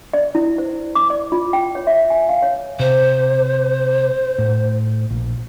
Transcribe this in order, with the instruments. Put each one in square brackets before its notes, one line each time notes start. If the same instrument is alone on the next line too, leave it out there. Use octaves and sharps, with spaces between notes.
[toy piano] D5
E4
C5
D6
D5
F4
G5
C#5
E5
G#5
F5
C#5
[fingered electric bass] C3 [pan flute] C5
[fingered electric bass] A2
A#1